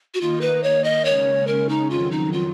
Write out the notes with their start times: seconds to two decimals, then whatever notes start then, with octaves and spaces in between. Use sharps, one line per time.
0.14 F#4
0.20 D#3 A#3 D#4 F4
0.41 B4
0.64 C#5
0.84 D#5
1.05 C#3 G#3 C#4 C#5
1.47 A#4
1.69 D#4
1.90 F2 D#3 F#3 F4
2.11 D#4
2.32 F4